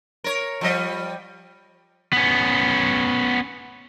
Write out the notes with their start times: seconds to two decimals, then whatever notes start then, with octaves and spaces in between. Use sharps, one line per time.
0.24 A#4 C#5
0.61 F3 G3 D#5
2.13 B3 C#4